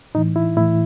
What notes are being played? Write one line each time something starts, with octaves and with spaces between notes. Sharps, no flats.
A2 E3 D#4
E4
A2 E3 E4